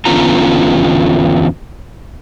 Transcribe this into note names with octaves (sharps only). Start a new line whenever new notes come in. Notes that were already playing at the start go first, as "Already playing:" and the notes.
E2 D3 B3 C#4 F4 A#5